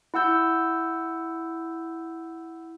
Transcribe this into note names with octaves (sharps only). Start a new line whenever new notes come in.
E4 F#5 E6 G6